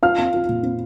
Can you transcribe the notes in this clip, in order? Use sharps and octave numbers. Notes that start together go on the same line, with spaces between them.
F4 F5 F6
C4
F4
A#2
C4